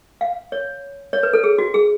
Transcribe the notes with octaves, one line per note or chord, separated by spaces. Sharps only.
F5
C#5
C#5
B4
A4
G#4
F#4
G#4